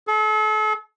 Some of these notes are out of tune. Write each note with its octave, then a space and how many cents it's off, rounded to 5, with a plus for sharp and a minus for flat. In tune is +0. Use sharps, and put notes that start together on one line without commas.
A4 -40